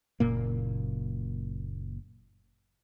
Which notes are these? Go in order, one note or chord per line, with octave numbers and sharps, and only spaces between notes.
F#1 A#2 A#3